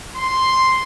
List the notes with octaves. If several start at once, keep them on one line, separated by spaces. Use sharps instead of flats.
C6